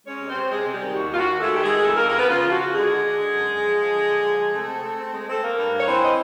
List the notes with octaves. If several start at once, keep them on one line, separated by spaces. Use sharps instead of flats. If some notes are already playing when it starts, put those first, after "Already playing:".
G#3 C#4 C#5
C3
C4 C5
C3
C3 G#3 G#4
C3
G3 G4
D#3
D#2 F#4
D#2 F4
F#4
D#2
G#3 A3 A4
D#3 G4
G#3 G#4
D#3
F2 A3 A4
A#3 A#4
F2
A#3 A#4
C#3 B3 B4
C#3 F4
F3
F#4
C#3
D3 G#3 G#4
D3
D3
D3
F#2
F#2
F3
F3
D3
D3
F3
G#3
C3 A3 A4
C4
C4
C4
G#3
C4 A4
A3 A#3 A#4
G2
G2
C#5
E3 C4 C5
D#5